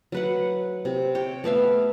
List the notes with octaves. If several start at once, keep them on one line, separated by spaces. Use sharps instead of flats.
F#3 B4 F#5
C3
C#5 G5
A3 B3 E5 F5